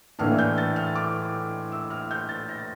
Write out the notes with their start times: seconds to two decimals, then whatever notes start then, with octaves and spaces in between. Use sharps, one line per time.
0.19 A2 E3 A#3 D4 F6
0.39 G6
0.58 A6
0.76 F6
0.95 D6
1.72 E6
1.90 F6
2.11 G6
2.29 A6
2.49 A#6